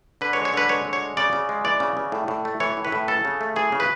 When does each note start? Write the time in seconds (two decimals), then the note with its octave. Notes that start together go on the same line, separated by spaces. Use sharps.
0.21 D3 B4
0.33 C#5
0.37 G#3
0.45 C#5
0.54 D3 B4
0.69 G#3 C#5
0.85 D3
0.93 C#5
1.01 G#3
1.17 C#3 D5
1.33 C#3
1.49 G#3
1.65 E3 D5
1.80 C#3
1.97 C#3
2.12 A2
2.28 A2
2.45 A3
2.60 E3 C#5
2.77 A2
2.85 B4
2.92 A2
3.08 C#3 A4
3.25 C#3
3.41 A3
3.56 E3 G#4
3.72 C#3
3.80 B4